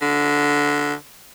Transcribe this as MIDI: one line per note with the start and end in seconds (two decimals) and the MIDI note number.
0.02 0.94 50